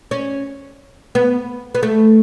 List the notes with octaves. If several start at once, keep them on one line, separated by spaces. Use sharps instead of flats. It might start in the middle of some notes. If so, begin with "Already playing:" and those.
C#4
B3
B3
A3